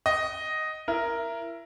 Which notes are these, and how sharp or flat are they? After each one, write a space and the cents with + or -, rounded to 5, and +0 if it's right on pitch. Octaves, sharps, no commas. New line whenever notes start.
D#5 +0 F#5 +40
E4 +25 A#4 +0